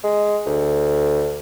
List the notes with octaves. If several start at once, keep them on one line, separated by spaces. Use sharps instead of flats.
G#3
D2